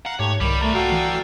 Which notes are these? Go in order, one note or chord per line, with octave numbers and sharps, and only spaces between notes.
F5 F#5 A#5
G#2 A3 G4 C#5
C2 D#3 G3 B5 D6
A3 D5 A#5
F#4 A4 F5 G5
E3